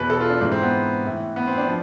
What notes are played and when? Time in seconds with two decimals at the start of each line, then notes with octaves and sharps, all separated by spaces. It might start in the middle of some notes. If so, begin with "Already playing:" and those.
Already playing: E2 B2 B4
0.10 A4
0.20 F4
0.30 D4
0.41 G#2 E3 D4
0.52 C4
0.63 B3
1.04 A2 E3
1.36 B3
1.47 C4
1.58 D4
1.68 F3